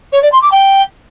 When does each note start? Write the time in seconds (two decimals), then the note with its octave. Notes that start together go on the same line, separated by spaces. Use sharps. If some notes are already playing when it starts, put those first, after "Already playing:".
0.13 C#5
0.22 D5
0.32 C6
0.42 D6
0.52 G5